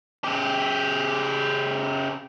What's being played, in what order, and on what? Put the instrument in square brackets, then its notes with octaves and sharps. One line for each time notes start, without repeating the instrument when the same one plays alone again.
[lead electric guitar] C#3 G4